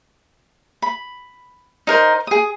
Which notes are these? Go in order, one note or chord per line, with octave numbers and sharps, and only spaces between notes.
B5
D#4 A#4 C5
G#4 D#6